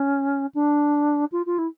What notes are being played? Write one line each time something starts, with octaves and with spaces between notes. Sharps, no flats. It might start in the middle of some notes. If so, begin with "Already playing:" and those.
Already playing: C#4
D4
F4
F4
E4